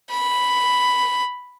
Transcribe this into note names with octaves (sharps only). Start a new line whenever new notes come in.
B5